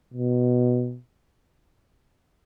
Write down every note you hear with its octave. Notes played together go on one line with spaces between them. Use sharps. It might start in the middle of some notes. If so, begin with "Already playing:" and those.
B2